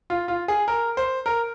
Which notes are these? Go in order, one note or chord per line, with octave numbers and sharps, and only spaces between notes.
F4
F4
G#4
A#4
C5
A#4